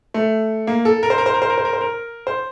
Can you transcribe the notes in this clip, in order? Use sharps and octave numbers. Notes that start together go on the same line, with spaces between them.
A3
A#3
A4
A#4
C5
A#4
C5
A#4
C5
A#4
C5
A#4
C5
A#4
C5